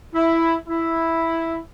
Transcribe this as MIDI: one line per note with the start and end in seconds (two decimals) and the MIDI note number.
0.15 0.55 64
0.68 1.58 64